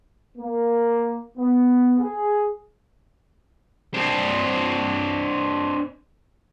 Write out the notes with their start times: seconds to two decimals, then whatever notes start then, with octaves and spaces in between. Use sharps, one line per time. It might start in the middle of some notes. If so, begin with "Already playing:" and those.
0.38 A#3
1.38 B3
1.99 G#4
3.94 C4 D4